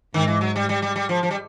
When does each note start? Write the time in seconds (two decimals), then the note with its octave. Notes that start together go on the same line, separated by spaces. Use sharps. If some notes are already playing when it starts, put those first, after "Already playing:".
0.14 G#2 D#3
0.28 E3
0.41 F#3
0.56 G3
0.69 G3
0.82 G3
0.96 G3
1.09 F3
1.23 F3
1.31 G3